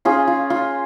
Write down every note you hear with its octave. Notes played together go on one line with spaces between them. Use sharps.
C#4 F4 G#4
F4
F4